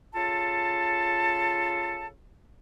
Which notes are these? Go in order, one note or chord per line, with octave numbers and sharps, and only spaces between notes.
C#3 F4 A4 A5